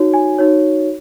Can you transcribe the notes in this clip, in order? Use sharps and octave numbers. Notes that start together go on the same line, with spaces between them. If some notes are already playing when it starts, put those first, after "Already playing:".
Already playing: D#4 F#4 C#5
G#5
D#4 F#4 C#5